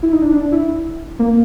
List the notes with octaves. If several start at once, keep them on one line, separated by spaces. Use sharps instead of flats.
E4
D#4
D4
D4
E4
A#3